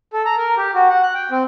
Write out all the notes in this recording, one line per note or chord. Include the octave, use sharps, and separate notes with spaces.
A4
A#5
A#4
G4
F#4
F#5
F#6
G5
C4